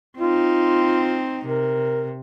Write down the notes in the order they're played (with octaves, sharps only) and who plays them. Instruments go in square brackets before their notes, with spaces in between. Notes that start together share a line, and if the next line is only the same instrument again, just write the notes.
[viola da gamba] C4 D#4 [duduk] F4
[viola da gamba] C3 [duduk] A#4